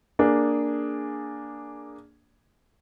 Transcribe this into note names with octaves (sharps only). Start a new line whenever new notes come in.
A#3 D4 G#4